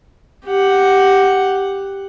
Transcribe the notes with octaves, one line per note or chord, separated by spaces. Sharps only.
G4 F#5